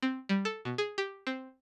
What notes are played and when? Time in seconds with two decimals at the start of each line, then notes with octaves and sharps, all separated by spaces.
0.03 C4
0.29 G3
0.45 A4
0.65 B2
0.78 G#4
0.98 G4
1.27 C4